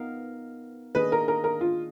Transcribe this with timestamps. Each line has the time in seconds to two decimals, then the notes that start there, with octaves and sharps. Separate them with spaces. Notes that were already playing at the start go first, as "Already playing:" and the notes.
Already playing: B3 D#4 A#4 F5
0.95 D#3 A#3 D4 G#4 B4 D#5
1.12 A#4
1.28 A#4
1.44 A#4
1.61 F4